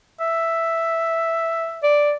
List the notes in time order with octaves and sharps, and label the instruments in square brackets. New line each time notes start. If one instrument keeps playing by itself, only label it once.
[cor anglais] E5
[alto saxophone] D5